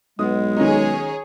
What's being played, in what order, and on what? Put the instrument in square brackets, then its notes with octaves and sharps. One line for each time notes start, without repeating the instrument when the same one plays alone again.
[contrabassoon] B1 [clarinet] G#3 [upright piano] B3 D#6
[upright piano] D#3 C#4 D#4 [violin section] G#4 C#5